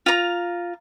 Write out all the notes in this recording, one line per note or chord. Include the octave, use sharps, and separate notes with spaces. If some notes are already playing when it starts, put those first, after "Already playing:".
F4 A#5